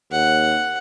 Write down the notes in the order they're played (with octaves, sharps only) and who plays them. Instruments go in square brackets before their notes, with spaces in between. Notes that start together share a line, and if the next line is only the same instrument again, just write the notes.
[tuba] D#2 [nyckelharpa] F#5